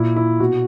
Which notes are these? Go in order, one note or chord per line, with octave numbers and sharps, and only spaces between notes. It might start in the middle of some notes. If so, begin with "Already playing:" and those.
Already playing: A#2 E4
E4
B2 F#4